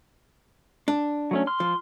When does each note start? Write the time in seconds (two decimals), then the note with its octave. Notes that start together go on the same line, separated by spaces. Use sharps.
0.88 D4
1.31 F#3 A3 C#4
1.47 C6 F6
1.60 F3